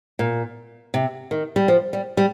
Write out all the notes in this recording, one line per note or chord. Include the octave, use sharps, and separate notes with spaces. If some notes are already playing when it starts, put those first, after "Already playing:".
A#2
C3
D#3
G3
F3
G3
G3